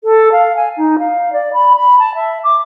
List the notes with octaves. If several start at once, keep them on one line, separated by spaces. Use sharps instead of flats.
A4
F5
G#5
D#4
F5
D5
B5
B5
A5
E5
D6